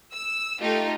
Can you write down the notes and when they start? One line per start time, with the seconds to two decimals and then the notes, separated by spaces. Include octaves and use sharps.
0.13 E6
0.60 A3 D#4 F4 G4